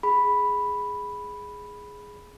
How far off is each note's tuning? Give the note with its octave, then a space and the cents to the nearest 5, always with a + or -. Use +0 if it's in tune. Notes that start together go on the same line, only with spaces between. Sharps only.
G#4 +0 B5 +0